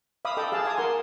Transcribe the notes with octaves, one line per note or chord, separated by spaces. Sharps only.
E5 F5 B5 D6 D#6
A4 D#5 G5 D6 D#6
G#4 F5 A5
E5 G#5 A5 D6 D#6
A#4 F#5 C6